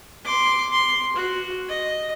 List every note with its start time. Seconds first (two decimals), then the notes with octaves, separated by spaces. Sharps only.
0.24 C6 D6
0.72 C6
1.16 F#4
1.68 D#5